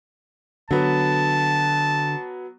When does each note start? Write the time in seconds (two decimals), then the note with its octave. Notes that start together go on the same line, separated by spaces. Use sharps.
0.71 D3 F#3 B3 A5